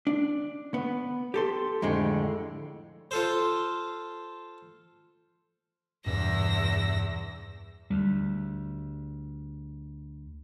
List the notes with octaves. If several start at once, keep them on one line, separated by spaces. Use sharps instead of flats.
D4
B3
G4 A4 C6
F2 A2 D3 G#3 C4
F4 A4 C5
E2 G2 B2 E6 A#6
D2 G3